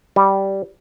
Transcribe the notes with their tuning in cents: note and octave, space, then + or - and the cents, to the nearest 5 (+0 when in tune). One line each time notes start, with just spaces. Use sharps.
G3 -10